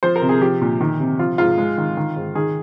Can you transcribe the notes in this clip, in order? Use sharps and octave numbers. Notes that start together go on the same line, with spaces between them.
F3 C5
A#4
C3
G#4
F3 G4
A#2
D#3
C3
F3 F4
G#2 F4
G#3
D#3
D#3
G#2
D#3 G#4